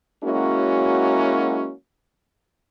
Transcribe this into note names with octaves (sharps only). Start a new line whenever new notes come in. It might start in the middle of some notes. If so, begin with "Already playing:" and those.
F#3 G#3 A#3 C#4 E4 F#4